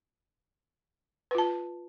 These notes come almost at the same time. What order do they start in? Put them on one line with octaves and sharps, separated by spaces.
B4 F4 A5